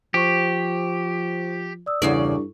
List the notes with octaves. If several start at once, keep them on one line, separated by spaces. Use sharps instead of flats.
F3 G4 C5 C#6
D5 D#6 E6
E2 G2 C#3 E4 A4 D5 C#6